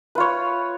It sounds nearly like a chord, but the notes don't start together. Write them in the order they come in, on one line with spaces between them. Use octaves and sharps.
B4 F4 C#5